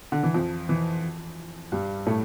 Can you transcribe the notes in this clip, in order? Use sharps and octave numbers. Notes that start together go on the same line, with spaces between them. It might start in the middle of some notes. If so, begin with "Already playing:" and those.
D3
E3
F2 F3
E3
G2 G3
A2 A3